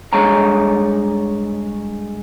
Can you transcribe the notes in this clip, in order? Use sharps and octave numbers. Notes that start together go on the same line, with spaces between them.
G2 G#3 A4 C#5 A#5